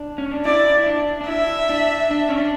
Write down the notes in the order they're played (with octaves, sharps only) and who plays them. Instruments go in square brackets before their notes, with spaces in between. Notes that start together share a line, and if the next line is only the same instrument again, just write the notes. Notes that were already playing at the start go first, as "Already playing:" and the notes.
Already playing: [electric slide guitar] D4
C#4
D4
[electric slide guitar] E4 [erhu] D5
[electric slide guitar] E4
D4
D4
[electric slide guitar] E4 [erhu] E5
[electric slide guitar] D4
D4
C#4
D4